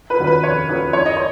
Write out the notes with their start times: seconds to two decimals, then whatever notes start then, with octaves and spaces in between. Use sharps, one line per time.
0.10 B4
0.19 D#2 D#3 F#3 C#4
0.27 B4
0.43 F1 C#5
0.69 D#2 D#3 F#3 C#4
0.93 F#1 C#5
1.06 D#5
1.17 C#5